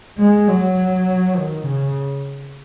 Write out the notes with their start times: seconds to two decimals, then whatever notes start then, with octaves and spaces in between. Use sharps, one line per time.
0.18 G#3
0.48 F#3
1.36 D#3
1.66 C#3